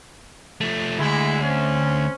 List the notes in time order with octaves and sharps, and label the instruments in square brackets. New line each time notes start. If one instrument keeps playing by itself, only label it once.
[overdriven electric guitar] F3 A3
[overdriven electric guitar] D2 [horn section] G#3 E4
[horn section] C4 C#4